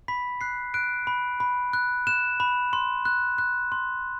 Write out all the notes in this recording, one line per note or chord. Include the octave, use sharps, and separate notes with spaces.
B5 B6
F#6 C7
F#6 D7
B5
B5
F#6
F#6 E7
B5
C6
F#6
F#6
C6